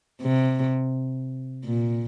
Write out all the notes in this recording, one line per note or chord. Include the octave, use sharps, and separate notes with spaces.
C3
A#2